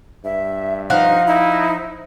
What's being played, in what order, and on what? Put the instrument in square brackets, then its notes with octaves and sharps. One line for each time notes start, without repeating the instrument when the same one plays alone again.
[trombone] G2 [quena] E5
[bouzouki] F3 F5 F#5 [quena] D#4
[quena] D#4 [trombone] E4